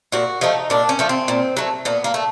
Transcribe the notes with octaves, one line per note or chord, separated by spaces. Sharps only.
A#2 F#4
F3 A3 D#4
A#2 D4
C#4
F3 A3
C4
A#2
F#3 A3
A#2 B3
A#3
A3